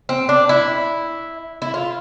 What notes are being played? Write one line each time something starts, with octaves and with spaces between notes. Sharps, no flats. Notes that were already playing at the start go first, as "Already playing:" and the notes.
C4
D4
E4
E4
F4